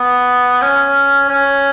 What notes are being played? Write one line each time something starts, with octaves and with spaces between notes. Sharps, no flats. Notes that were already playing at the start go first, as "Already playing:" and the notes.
Already playing: B3
C#4
C#4